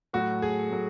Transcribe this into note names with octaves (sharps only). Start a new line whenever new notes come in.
A2 F#3 A3 F#4
G#4
A2 F#3 A3